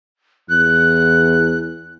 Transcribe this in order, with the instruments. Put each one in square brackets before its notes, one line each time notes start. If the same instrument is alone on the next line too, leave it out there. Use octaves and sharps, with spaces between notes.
[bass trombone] E2 [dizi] F#6